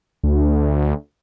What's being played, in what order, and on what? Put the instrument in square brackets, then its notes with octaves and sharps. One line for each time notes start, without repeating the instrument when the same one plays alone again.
[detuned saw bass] D2